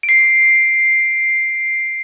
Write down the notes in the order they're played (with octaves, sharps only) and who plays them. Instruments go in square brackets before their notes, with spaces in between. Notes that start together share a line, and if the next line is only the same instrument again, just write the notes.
[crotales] D7
C7